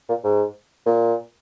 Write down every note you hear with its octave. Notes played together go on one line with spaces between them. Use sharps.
A#2
G#2
A#2